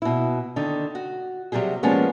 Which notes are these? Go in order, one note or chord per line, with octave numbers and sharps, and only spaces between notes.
B2 E4
D3 D#3 D#4
F#4
C3 F#3 G3 G4 G#4
F3 G3 G#3 A#3 B3 C#4